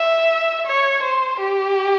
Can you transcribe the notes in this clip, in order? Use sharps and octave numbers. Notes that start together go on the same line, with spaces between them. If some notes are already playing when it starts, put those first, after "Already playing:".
Already playing: E5
C#5
C5
G4